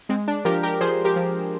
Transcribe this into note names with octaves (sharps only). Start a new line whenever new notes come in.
G#3 C4
D4
F3 G4 A#4
G4 A#4
F3 G#4 C5
G4 A#4
F3